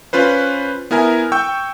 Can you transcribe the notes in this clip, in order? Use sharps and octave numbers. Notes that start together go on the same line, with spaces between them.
C#4 F4 B4 C5
B3 E4 A#4 G#5 A#5
G5 C#6 E6 G6